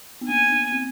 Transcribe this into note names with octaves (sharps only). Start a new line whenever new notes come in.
B3
A#3 G#5
B3
C4